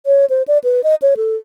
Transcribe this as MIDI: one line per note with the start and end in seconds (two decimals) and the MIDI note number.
0.06 0.25 73
0.30 0.43 72
0.48 0.58 74
0.64 0.81 71
0.84 0.95 75
1.02 1.14 73
1.17 1.36 69